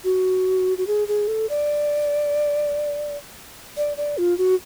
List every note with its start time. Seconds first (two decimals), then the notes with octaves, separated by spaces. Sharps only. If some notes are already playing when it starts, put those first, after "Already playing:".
0.04 F#4
0.78 F#4
0.87 G#4
1.08 G#4
1.28 A4
1.49 D5
3.77 D5
3.97 D5
4.18 F4
4.38 F#4